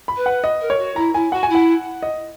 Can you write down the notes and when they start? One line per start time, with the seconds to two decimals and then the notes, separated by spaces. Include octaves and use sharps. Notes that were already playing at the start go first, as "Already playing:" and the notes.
0.08 B5
0.17 B4
0.26 F#5
0.44 D#5
0.61 A#4
0.70 C#5
0.78 F#4
0.96 E4 A#5
1.14 E4 G#5
1.32 F#4 F#5
1.43 G#5
1.49 E4
1.55 F#5
2.03 D#5